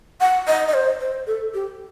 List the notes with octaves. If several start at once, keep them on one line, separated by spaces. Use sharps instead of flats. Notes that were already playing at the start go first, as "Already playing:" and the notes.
F#5
D#5
D#5
C5
C5
A4
G4